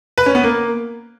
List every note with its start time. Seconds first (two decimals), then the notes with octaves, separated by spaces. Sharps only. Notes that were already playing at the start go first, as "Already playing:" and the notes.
0.18 B4
0.26 C#4
0.35 B3
0.43 A#3